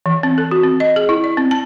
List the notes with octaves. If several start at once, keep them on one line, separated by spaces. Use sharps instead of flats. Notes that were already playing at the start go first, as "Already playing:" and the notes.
E3
C4
A4
F#4
C4
D#5
G#4
E4
D5
C4
A5